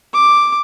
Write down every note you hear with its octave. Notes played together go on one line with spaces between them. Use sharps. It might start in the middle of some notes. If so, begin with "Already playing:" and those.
D6